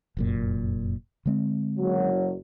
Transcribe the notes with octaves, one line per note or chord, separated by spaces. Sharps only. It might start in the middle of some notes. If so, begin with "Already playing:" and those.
F1 F#2 A#2
D3 G#3 C4
F#1 F#3